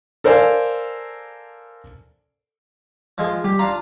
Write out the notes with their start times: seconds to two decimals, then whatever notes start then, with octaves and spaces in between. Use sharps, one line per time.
0.24 A4 A#4 C5 D5 F5 G#5
3.18 F3 G#3
3.44 G3 G4
3.59 D4 F4 A#5